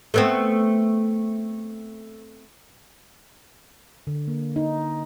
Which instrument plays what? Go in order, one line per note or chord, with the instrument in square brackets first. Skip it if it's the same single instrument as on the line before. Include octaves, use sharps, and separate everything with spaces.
[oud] A3 B3 C4
[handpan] D3
A#3
D#4